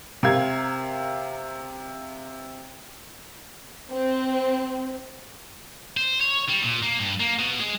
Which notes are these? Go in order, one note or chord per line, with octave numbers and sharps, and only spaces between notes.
C3 A#4 F5 G#6
C4
C5
C#5
G3
A#2
A#3
G2
A#3
B2
G#3